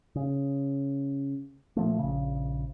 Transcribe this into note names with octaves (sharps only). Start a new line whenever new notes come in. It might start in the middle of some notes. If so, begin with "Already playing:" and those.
C#3
A#2 F3 A3
A#1 C#3